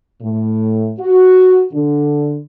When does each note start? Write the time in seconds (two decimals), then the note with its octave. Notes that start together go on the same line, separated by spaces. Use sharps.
0.21 A2
0.99 F#4
1.74 D3